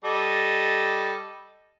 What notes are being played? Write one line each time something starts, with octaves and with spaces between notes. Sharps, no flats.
G3 A4 D#5